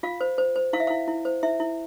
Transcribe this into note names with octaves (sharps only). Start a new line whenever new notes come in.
F4 F5
C5
C5
C5
E4 F5
E5
E4 F5
E4
C5
E4 E5
E4